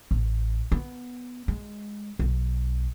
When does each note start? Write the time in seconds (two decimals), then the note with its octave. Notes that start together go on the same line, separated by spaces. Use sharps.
0.11 A1
0.72 B3
1.48 G#3
2.19 B1